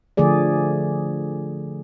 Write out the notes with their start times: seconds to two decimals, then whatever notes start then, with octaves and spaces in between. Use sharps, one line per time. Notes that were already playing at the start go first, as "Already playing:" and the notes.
0.17 D3 F3 A3 G#4 D5